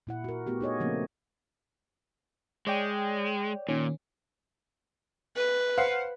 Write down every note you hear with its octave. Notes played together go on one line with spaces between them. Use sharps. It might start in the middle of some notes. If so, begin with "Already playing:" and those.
A#2 E4 F#5
F#4 A#4
A3 B3 F#4 G4
D#4 G#4 C#5 D#5
C#3 F3 A3 A#3 C4 C#4
G#3 C#5 D5 G5
A#2 D#3 C#4
B4
C5 F5 F#5